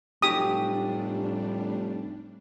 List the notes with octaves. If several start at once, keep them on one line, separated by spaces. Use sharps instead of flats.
F1 A2 F#3 G3 D4 G4 D#6